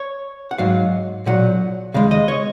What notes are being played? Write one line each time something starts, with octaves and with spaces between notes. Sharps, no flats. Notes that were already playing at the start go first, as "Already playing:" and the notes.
Already playing: C#5
F#5
G#2 F#3 F5
B1 A#2 F#3 F#5
D#2 C#3 G#3 F5
D#5
C#5